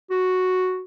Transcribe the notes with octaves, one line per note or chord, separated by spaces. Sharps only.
F#4